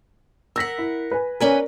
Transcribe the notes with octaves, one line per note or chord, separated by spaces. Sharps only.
A#4 F#5 E6 A#6 B6
E4
B4 G#5
C#4 A#4 B4 D5 G#5